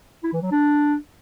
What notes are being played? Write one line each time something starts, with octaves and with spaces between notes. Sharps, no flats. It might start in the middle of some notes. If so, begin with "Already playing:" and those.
E4
E3
F#3
D4